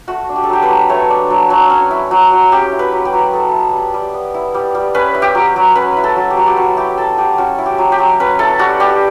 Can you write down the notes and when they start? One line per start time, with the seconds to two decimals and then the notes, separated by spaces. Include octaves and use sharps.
0.08 A3 F#4
0.29 D4
0.36 G4
0.44 A4
0.49 F#3 G4
0.63 B4
0.69 F#3
0.89 A3 C#5
1.10 D4
1.30 F#3
1.50 F#3
1.70 C#4
1.91 E4
2.11 F#3
2.31 F#3
2.52 C#4 G4
2.72 E4
2.79 B4
2.93 F#3
3.05 G4
3.13 F#3
3.33 B3 A4
3.53 E4
3.73 G3
3.94 G3
4.14 B3
4.34 E4
4.54 G3
4.75 G3
4.94 C#4 B4
5.15 E4
5.22 G4
5.35 F#3
5.56 F#3
5.75 C#4 B4
5.97 E4
6.04 A4
6.16 F#3
6.30 G4
6.37 F#3
6.47 G4
6.57 C#4 F#4
6.77 E4 G4
6.98 F#3 A4
7.17 F#3 G4
7.38 C#4 F#4
7.58 E4
7.66 G4
7.78 F#3
7.92 G4
7.98 F#3
8.20 C#4 B4
8.39 E4 A4
8.59 G3 F#4
8.80 G3 G4